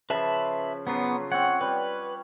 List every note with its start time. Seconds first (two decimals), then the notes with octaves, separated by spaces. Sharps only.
0.10 C#3 F3 B4 E5 A5
0.87 C#3 F3 F#3 B3
1.32 C4 C#5 F#5
1.61 G3 B4 C#5